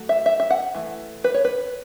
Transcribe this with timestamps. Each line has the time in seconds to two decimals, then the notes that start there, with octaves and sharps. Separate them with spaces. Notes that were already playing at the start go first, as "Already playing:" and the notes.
Already playing: F#3 A3
0.09 E5
0.26 E5
0.40 E5
0.50 F#5
0.74 E3 A3
1.24 B4
1.34 C#5
1.45 B4